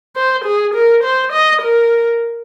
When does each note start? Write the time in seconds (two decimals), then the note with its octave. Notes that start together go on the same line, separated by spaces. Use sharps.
0.16 C5
0.45 G#4
0.74 A#4
1.04 C5
1.32 D#5
1.62 A#4